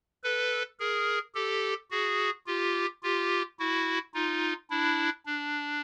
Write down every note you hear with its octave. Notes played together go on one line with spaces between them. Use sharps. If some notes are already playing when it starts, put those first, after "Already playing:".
A4 B4
G#4 A#4
G4 A4
F#4 G#4
F4 G4
F4 G4
E4 F#4
D#4 F4
D4 E4
D4